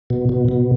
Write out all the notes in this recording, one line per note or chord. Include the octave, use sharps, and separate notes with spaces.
B2
B2
B2